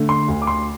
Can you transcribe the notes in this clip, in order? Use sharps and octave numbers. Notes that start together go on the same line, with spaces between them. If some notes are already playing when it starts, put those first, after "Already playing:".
Already playing: D3 A3
C6
D2
D6
C6